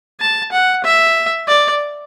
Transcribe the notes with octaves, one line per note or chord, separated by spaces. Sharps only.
A5
F#5
E5
D5